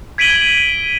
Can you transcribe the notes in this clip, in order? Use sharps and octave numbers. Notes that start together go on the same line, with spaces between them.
G#6 B6 D7 D#7 F#7 G7